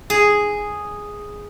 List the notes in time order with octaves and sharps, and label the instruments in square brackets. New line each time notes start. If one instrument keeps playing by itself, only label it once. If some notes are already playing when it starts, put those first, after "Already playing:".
[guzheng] G#4